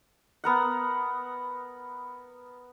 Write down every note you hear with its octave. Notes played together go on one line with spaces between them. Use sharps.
B3 A#4 F#5